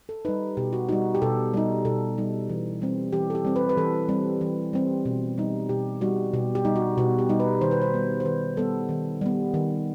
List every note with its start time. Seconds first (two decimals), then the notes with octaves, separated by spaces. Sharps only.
0.09 A4
0.25 D#4 B4
0.28 G3
0.57 B2 G4
0.73 F#4
0.89 G3 D#4 F#4
1.15 G4
1.22 B2 A4
1.54 G3 D#4
1.85 B2 A4
2.18 G3 D#4
2.49 E3
2.82 G3 C4
3.13 E3 G4
3.30 A4
3.35 G4
3.45 G3 C4
3.56 B4
3.69 B4
3.77 E3 A4
4.09 G3 C4
4.41 E3
4.73 G3 C4
5.05 B2
5.38 G3 D#4
5.69 B2 G4
6.01 G3 D#4 F#4
6.33 B2 G4
6.55 G4
6.65 G3 D#4
6.76 F#4
6.98 B2 F#4
7.19 G4
7.29 G3 D#4
7.40 B4
7.61 D#3 C5
7.71 B4
7.82 C5
7.94 G3 B3
8.20 C5
8.25 D#3 B4
8.57 G3 B3 A4
8.89 D#3
9.21 G3 B3
9.54 D#3